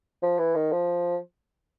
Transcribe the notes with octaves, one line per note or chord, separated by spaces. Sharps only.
F3
E3
D#3
F3